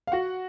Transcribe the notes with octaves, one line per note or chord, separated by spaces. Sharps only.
F5
F#4 F#5